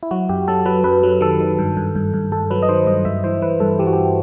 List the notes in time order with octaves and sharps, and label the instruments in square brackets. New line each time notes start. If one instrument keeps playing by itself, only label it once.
[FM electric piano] E4
F#3 F#4
F#2 G4
F#3 A4
F#3 B4
F#2 B4
F#3
D#3 A4
D#3
G2
G2
G2
G2
G2 A4
F#3 B4
D#5
D#3 C5
G2 D#5
G2 E5
E3 C5
E3 B4
G2 A4
E3 G4
F#4
G4